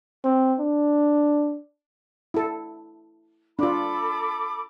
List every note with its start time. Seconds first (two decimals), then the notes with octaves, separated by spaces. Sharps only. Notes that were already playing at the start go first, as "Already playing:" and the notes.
0.24 C4
0.60 D4
2.34 E4 A4
3.59 D4 F4 A4 B5 D6